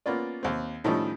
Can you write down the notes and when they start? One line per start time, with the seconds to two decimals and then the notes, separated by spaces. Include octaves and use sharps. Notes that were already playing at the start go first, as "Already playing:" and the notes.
0.06 A#3 B3 C#4 F4 D5
0.43 D#2 C4
0.84 A2 D#3 F3 G3 C#4 D#4